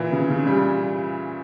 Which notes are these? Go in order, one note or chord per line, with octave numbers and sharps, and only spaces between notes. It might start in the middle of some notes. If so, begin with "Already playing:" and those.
Already playing: A#2 E3
C#3
C#3
G3